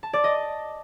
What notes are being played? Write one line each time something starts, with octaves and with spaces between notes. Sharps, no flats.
A5
D5
D#5